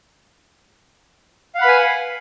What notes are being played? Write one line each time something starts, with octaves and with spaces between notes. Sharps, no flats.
B4 F5 F#5 G#5 B5